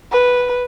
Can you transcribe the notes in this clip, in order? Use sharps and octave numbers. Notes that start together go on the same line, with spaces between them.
B4